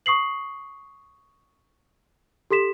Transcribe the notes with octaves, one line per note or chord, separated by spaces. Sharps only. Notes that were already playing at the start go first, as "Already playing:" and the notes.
C#6 D#6 C7 F#7
G4 A4 C6 B6 E7